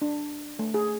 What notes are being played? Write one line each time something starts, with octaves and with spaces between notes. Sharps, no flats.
D4
A3
G#4